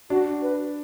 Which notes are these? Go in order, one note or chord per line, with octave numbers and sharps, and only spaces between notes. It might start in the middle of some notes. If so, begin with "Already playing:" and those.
D4 F#4
B4